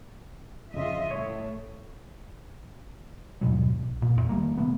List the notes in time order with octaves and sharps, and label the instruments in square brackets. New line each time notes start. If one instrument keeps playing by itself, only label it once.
[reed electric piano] F2 C#3 [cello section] F4 D#5 E5
[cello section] A2 A3 [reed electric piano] C#5
[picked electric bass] D#2 G#2 B2 F#3
B1
A#2
D#1 G#1 E2
D#3 F#3 G3 A#3
C3 A3 B3